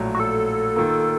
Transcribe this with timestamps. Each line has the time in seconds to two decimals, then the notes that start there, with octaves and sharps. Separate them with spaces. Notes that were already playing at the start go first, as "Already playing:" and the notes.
Already playing: A#1 A2 F#3
0.15 F#4
0.20 A4
0.76 D#3 A#3 F4